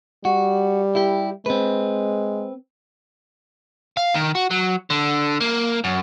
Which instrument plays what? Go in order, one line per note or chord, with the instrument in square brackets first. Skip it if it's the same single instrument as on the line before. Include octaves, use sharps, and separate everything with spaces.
[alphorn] G3 [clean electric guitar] F#4
[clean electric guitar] E4 G4
[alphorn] G#3 [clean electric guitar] C4 B4
[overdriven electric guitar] F5
D#3
F#4
F#3
D3
A#3
F#2